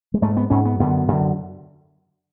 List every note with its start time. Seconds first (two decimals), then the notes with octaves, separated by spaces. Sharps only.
0.14 G#3
0.22 G#2 A3
0.37 B3
0.50 G#2 C#4
0.65 B3
0.79 F#2 D3 B3
1.08 F#2 D3